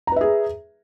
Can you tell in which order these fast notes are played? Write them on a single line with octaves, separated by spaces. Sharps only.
A#5 B4 E5 G#4